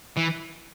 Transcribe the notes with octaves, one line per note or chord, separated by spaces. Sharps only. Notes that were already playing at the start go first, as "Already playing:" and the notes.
E3